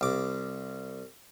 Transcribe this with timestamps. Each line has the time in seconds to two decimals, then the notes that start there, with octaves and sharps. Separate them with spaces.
0.01 C2 D6